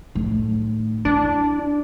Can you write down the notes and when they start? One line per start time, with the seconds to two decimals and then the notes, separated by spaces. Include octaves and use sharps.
0.15 A2 D#3
1.05 D4 E4